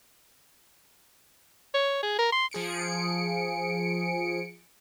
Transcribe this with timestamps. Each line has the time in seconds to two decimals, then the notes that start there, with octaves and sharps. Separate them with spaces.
1.74 C#5
2.03 G#4
2.19 A#4
2.32 C6
2.51 F3 G#4 C#7 D7